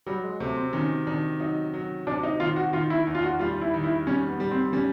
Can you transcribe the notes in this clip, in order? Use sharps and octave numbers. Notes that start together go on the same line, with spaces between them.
F#3 G3
G#3
C3 A3
C4
D#3 C#4
D#3 D4
F#3 D#4
F#3
C3 D4
D#4
D#3 F4
F#4
D#3 F4
E4
E2
F4
F#4
G3 F4
E4
D#3
E4
G3 C#4
B3
G3
C4
G3 C#4